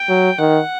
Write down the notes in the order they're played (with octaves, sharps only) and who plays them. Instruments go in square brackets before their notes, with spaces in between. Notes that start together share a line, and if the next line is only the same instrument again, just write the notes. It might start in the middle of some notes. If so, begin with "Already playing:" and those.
Already playing: [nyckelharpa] G5
[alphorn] F#3
[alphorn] D#3 [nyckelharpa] F#5